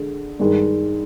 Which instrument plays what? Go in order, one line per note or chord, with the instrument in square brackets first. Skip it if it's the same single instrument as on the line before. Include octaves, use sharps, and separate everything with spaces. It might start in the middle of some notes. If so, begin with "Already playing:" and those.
Already playing: [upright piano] D3 G#3
G2 D#3 G#3